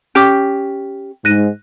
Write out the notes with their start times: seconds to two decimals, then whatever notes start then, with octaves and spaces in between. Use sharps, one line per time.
0.15 C#4 G4 G5 D6
1.25 G#2 F#6 A#6 D#7